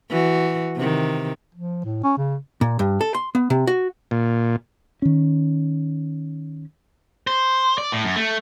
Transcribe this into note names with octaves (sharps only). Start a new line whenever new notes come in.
E3 F#4
C3 D#3
F3
A2
C#4
C#3
A#2
G2
A4
C6
B3
C3
F#4
A#2
D#3 C#4
C5
D5
A2
F#2
A3